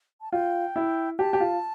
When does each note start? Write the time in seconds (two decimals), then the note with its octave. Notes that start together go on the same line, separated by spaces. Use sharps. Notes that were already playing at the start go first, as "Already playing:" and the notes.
0.21 A5
0.32 F4 G5
0.76 E4
1.19 G4 A5
1.33 G4
1.40 F4